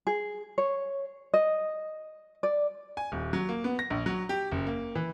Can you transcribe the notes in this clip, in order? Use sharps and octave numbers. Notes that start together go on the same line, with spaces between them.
G#4
C#5
D#5
D5
G#5
D#1
F#3
A#3
B3
A#6
A#1
F#3
G4
F#1
A#3
E3